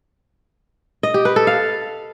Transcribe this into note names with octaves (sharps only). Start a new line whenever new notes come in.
D#5
G4
B4
A4
F5